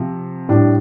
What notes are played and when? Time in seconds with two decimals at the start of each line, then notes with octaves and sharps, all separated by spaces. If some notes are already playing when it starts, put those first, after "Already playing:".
Already playing: C3 F3
0.49 A2 G3 D4